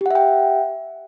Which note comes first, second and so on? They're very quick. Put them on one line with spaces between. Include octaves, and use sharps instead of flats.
G4 F#5 E5 G5